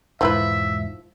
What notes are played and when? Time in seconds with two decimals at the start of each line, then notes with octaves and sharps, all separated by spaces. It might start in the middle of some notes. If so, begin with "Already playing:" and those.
0.21 E1 G#2 F3 E4 B4 E5